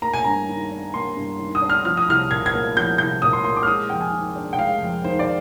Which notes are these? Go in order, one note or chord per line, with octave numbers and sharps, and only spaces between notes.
A#3 A#5
G#5
G2 A#5
D#3
D4
A#3 C6
G2
D#3
D#6
D4
F6
F3 F6
D#6
C2 F6
A#2 G#6
G#6
A#3
F3 G6
C2 G6
A#2 D#6
C6
A#3 C6
D6
F6
G#3 D#6
F2 G5
G#5
D#3
D4
G5
G#3 F5
F2
D#3 C5
D5